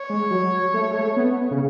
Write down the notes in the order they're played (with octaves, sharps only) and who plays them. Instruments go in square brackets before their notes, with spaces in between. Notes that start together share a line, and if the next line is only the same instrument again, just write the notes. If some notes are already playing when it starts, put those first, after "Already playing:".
Already playing: [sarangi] C#5
[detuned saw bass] G#3
F#3
A3
G#3
A3
B3
C#3